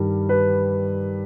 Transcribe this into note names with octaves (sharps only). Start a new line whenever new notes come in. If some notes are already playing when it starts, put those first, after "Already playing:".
Already playing: G2 D#3 G3
B4